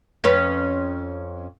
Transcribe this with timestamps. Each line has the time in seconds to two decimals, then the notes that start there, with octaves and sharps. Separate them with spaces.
0.24 F2 C#4 B4